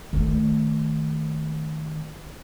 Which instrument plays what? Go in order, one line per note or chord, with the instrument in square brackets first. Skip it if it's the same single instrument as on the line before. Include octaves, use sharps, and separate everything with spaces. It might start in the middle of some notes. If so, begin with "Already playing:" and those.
[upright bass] D#3 A3